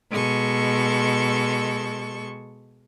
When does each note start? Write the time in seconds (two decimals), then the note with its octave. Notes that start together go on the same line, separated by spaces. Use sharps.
0.11 B2 G#3 A4 C#6